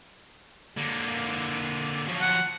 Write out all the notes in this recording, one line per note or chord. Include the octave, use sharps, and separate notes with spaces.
D3 A#3
F3 F#3
F#5